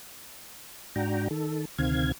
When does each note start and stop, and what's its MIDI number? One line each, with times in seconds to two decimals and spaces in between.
0.96 1.28 44
0.96 1.28 62
0.96 1.28 66
0.96 1.28 79
0.96 1.28 82
1.31 1.65 51
1.31 1.65 69
1.78 2.12 38
1.78 2.12 48
1.78 2.12 51
1.78 2.12 60
1.78 2.12 77
1.78 2.12 92